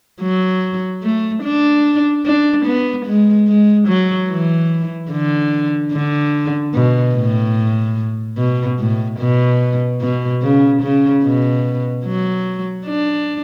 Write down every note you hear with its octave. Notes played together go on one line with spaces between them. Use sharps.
F#3
A3
D4
D4
B3
G#3
G#3
F#3
E3
D3
D3
B2
A2
B2
A2
B2
B2
C#3
C#3
B2
F#3
D4